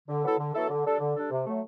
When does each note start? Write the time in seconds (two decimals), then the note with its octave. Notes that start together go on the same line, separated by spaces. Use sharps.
0.08 D3
0.23 F#3 B3 E4 A4
0.38 D3
0.54 F#3 B3 E4 A4
0.70 D3
0.84 G3 D4 A4
1.00 D3
1.15 G3 D4 A4
1.30 C3
1.46 F#3 A3